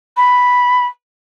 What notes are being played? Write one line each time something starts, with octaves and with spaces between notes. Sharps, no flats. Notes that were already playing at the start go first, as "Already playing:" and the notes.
B5